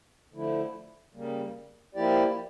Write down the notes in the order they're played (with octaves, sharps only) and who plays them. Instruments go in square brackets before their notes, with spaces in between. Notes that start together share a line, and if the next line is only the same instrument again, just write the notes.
[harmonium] D3 F3 A3 E4
C#3 G3 A#3
F3 A#3 E4 G4 D5